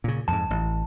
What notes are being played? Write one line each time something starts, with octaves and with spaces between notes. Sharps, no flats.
A#2 C#3
F2 G#2 A5
A1